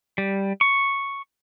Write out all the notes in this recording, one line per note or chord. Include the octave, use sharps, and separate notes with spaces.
G3
C#6